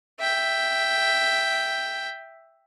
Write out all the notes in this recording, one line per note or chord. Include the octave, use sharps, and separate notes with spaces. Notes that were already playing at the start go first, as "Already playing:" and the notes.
E5 G5